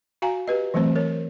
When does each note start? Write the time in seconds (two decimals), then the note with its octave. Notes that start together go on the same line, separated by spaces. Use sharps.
0.22 F#4 F5 G#5 A#5
0.48 G4 B4 D#5
0.74 E3 F#3 A3 C4 C5
0.96 A#4 C#5